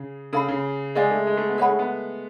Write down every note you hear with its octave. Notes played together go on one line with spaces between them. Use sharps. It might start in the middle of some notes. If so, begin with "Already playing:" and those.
Already playing: C#3
C#3 A4 F5 B5
C#3
G#3 G#4 D5 F5 G#5
A3
G#3
A3
B3
G#3 G#4 C#5 F#5 B5
A3
B3